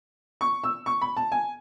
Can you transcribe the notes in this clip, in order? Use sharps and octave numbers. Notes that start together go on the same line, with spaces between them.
C#6
E6
C#6
B5
A5
G#5